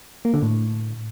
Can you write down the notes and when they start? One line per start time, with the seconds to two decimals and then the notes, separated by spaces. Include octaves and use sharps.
0.25 A#3
0.34 D3
0.42 A2